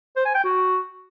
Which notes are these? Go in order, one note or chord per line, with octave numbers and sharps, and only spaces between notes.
C5
G#5
G5
F#4